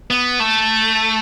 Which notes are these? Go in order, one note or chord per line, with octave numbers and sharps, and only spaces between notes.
B3
A3